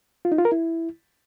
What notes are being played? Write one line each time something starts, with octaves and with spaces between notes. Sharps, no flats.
F4
D#4
F4
A#4
E4